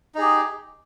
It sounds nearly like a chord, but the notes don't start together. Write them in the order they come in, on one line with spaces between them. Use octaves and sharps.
D#4 G#4 G4